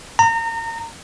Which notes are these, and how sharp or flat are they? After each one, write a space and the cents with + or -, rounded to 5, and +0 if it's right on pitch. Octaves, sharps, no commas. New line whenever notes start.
A#5 -30